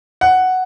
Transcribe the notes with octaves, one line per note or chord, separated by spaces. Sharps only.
F#5